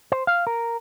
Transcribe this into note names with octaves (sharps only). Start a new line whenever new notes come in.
C5
F5
A#4